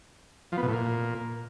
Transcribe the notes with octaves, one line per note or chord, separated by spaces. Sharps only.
F3
B3
B2
A2
A#2